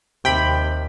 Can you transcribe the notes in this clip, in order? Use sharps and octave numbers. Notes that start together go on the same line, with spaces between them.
D#2 C3 G5 B5